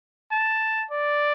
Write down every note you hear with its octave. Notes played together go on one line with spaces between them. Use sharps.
A5
D5